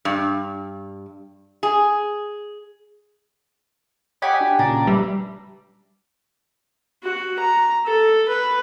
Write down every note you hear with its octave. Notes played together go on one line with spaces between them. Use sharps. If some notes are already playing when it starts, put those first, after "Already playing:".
G2
G#4
G4 C#5 D#5 F#5 G#5 B5
D4 F#4
A#2 C#3 D4 A#5
G3 B4 E5
F#4
A#5
A4
B4